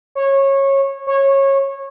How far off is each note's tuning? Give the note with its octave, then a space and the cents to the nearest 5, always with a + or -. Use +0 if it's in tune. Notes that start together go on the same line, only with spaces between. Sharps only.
C#5 -20
C#5 -20